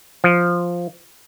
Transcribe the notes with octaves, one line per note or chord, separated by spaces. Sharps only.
F3